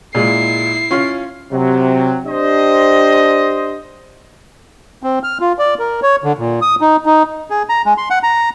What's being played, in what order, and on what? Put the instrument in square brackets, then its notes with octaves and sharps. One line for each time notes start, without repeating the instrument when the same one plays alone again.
[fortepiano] A#2 G#3 [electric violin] E4 C7
[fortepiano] C#4 F4 F5
[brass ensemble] C3 F#3
D4 G4 C5 D#5
[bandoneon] C4
F6
F4
D5
A#4
C#5
D3
A#2
D#6
D#4
D#4
[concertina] G#4
A#5
G#3
C6
F#5
A#5